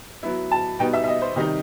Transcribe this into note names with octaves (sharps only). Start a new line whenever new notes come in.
F#3 B3 E4
A5
B2 G3 B3 D#4 G5
E5
E5
D#5
C5
C3 D#3 G3 D#4 D#5